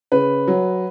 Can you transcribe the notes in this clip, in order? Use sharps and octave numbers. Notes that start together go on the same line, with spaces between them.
C#3 B4
F#3